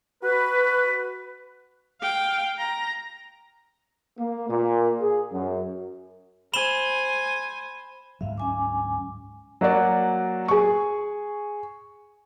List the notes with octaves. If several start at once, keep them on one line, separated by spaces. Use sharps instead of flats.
F#4 B4
F5 G5
A#5
A#3
A#2
G#4
F#2
C5 G#5 B5 E7 G7
D2 G#2 F#3 E5 F5
C#4 G#5 D6
F#3 A#3 F#4 D5
G#4 C#6